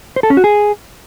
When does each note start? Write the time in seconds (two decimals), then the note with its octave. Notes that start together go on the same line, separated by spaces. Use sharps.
0.16 C5
0.23 A4
0.30 C#4
0.37 F#4
0.44 G#4